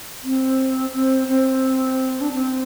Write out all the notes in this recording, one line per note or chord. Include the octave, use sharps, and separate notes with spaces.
C4
C4
C4
D4
C4